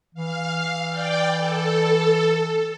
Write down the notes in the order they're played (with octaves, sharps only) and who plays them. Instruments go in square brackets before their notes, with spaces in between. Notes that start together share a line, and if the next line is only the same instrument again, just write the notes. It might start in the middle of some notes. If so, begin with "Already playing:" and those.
[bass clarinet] E3 [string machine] F5
[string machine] D5 G5
A4